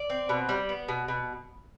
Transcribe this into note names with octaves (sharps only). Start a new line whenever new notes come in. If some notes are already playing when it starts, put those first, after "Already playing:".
Already playing: D5
C4
B2
G3
B3
B2
B2